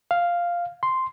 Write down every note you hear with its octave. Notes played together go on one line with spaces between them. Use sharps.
F5
C6